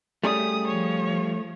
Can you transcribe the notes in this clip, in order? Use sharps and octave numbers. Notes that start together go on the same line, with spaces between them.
G3 A3 C#4 G#4 D#6
F3 C#5